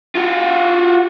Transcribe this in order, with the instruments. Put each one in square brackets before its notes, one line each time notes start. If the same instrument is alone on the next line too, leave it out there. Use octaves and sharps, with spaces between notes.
[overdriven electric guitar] F4 F#4